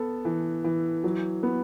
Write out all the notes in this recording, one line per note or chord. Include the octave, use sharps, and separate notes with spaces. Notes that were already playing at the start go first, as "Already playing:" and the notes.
Already playing: B3 A4
E3
E3
F#3
B3